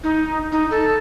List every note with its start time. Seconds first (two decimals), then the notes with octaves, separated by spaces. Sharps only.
0.04 D#4
0.52 D#4
0.71 A4